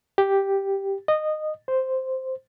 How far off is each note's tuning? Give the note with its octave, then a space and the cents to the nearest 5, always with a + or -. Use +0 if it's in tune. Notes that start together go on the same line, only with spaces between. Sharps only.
G4 +0
D#5 -15
C5 -5